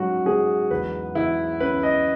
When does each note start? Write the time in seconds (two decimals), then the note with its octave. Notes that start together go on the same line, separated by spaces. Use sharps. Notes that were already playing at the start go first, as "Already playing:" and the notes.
Already playing: G#2 F#3 C#4 F#4
0.26 G#2 G#4
0.71 E2 B4
1.15 E2 E4
1.60 C#4 B4
1.83 D#5